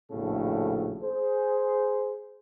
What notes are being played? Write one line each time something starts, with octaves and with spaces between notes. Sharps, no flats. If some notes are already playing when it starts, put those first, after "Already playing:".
A#1 D#2 A2 C#3 F#4 A4
G#4 C5